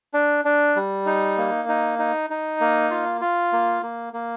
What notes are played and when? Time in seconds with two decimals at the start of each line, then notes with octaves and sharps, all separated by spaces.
0.14 D4
0.45 D4
0.76 G3
1.06 D#4
1.37 A#3
1.69 D#4
1.99 D#4
2.30 D#4
2.61 A#3
2.91 F4
3.21 F4
3.53 A#3
3.83 A#3
4.13 A#3